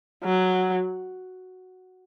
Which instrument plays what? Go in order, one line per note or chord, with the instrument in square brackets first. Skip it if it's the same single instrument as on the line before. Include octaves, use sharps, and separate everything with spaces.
[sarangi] F#3